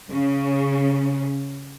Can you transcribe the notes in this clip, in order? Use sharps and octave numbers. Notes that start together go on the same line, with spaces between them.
C#3